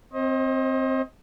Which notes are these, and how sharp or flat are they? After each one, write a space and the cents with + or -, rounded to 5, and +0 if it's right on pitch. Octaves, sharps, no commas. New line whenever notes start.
C4 +0 C5 +40 D#5 +20